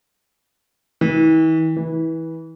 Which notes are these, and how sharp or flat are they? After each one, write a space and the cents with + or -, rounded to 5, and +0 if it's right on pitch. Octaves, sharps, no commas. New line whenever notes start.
E3 -45
E3 -25